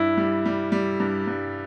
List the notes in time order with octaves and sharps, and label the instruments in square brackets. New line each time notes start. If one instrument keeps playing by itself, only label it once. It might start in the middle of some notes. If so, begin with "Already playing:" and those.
Already playing: [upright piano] G2 [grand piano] E4
[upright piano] G3
G3
G3
G2
G2